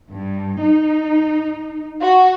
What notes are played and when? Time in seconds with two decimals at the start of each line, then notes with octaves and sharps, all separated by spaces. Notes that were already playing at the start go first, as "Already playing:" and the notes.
0.12 G2
0.62 D#4
2.02 F#4